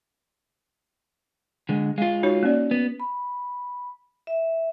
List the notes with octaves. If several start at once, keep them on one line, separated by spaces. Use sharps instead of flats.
D3 G#3
G#3 F4 F5
D#4 F#4 C#5
A#3 C#4 D5
B3
B5
E5